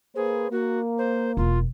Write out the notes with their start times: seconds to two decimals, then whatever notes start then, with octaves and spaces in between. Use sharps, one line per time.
0.16 A#3 G#4 B4 C5
0.52 A#3 F#4
0.98 C5
1.37 E1 F4